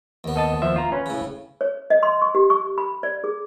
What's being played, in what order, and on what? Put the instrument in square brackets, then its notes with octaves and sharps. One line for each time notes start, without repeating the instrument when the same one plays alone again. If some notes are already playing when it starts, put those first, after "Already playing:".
[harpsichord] D#2 B3
[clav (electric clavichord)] A4 D#5 A5
F3 C5 E5
F4 A#5
C#4 B4
[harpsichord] A2 C#3
[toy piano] C#5
D#5
C6
C#6
G4
C#6
B5
D5
G#4